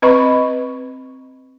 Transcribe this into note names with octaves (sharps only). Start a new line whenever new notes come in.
C4 B4 D#5 B5 C#6